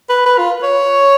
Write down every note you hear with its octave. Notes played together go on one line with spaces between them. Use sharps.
B4
B4
F4
C#5